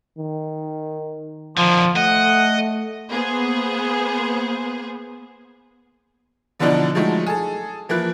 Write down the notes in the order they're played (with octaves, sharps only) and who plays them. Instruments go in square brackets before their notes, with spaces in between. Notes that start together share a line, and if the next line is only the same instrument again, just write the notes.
[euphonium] D#3
[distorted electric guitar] D3 D#3 [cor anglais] F3
[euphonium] A3 [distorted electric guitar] D#5 [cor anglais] F#5
[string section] A#3 B3 G#4 C5
[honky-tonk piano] B2 D3 E3 F3 D4 D#4
F3 F#3 G#3 A3 D#4
G#4 A4
E3 F3 A#3 E4 F#6